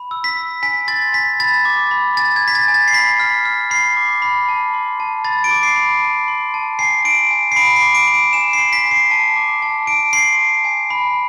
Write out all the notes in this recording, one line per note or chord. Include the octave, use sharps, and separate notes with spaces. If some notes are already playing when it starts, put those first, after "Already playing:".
Already playing: B5
E6
B6
E6
G#5 B6
C6 A6
G#5 B6
B5 A6
D6
B5
G#5 A6
G#6
C6
B6
A6
G#5
A6
C7
B5 B6
F6
F6
B5 C7
D6
B5
A5
C6
A5
B5 A6
D7
D6
C7
B5
A5
C6
A5
G#5 C7
C6 D7
G#5
C7
B5 D7
C7
D6
D7
B5
D7
G#5 E7
C7
C6
B6
G#5
C7
A5
D6
A5
A5 D7
C6 C7
A5
G#5
B5